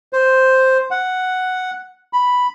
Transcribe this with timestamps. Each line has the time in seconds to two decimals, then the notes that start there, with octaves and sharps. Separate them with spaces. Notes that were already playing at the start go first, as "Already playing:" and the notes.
0.13 C5
0.91 F#5
2.13 B5